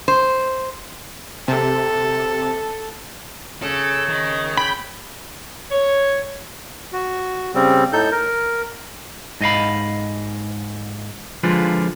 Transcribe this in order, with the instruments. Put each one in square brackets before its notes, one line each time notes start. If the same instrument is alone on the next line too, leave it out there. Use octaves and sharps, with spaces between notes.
[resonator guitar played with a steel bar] C5
[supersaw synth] C3 [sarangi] A4
[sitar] C#3 [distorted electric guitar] A4
[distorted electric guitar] D#3
[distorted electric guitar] G5 [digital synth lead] B5
[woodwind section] C#5
[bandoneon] F#4
C#3 G3 C4
A2 D#4 A4 G6
A#4
[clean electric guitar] G#2 D#5 F5 B5
D3 F3 G#3 F4 B4